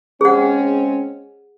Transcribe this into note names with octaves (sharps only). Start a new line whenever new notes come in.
G#3 C4 C#4 G#4 F#5